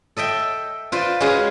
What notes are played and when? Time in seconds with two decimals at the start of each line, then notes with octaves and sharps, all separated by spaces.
0.17 A4 D#5 E5 G5
0.92 F4 B4 C5 D5
1.20 G#3 C#4 F#4 G#4 B4 F5